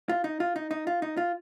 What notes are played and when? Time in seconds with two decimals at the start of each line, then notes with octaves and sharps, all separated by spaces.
0.09 F4
0.24 D#4
0.40 F4
0.56 D#4
0.71 D#4
0.87 F4
1.02 D#4
1.17 F4